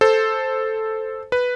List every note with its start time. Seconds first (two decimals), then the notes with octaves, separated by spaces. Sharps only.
0.01 A4 C5
1.32 B4